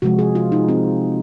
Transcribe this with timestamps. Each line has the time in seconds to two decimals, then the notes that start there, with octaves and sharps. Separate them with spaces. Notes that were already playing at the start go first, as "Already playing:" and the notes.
0.02 C3 F3 G#3 F#4
0.19 G#4
0.35 F4
0.52 D#4
0.69 C4